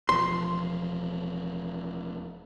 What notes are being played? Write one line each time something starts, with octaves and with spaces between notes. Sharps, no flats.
E1 F3 C6